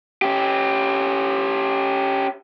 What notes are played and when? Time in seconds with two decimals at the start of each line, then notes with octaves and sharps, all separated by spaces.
0.22 C#4 G4